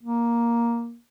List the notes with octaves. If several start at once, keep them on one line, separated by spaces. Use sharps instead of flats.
A#3